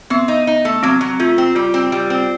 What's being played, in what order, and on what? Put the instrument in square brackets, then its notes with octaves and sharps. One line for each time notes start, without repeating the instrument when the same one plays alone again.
[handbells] B3 [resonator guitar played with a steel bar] C4
[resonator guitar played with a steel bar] D#4
D#4
A3
[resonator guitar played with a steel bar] F#3 [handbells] C4
[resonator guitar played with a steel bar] F#3
[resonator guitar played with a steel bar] A3 [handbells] F4
[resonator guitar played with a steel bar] C4
[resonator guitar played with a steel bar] G3 [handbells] F4
[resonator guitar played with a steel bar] C4
G3
C4